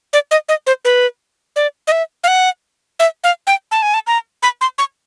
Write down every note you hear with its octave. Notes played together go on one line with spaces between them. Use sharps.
D5
D#5
D#5
C5
B4
D5
D#5
E5
F5
F#5
E5
F5
G5
A5
G#5
A5
A#5
B5
C6
C#6